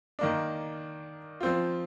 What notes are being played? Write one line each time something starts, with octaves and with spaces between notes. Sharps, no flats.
D#3 A#3 D4
F3 C4 F4